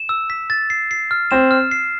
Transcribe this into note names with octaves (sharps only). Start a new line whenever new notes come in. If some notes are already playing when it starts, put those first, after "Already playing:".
Already playing: E7
E6
B6
A6
C7
C7
F6
C4 E7
F6
C7